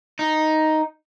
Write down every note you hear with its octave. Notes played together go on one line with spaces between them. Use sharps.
D#4